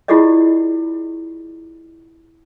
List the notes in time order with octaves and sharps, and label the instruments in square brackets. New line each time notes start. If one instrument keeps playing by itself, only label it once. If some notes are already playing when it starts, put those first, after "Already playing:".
[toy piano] E4 F4 G4 G#4 D5 D#5